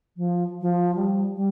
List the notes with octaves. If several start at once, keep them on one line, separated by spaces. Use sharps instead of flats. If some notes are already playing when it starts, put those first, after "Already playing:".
F3
F3
G3
G3